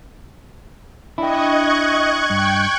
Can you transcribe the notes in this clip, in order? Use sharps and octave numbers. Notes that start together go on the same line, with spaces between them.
D4 E4 D#5 G5 C#6 F#6 G#6
G2 G5